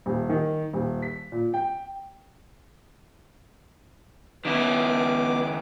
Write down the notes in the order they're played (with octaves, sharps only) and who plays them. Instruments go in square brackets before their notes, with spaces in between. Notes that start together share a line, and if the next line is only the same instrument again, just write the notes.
[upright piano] D#1
D#3
D#1
B6
A#2
G5
[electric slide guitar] D#3 C#4 E4 [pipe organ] B3 D6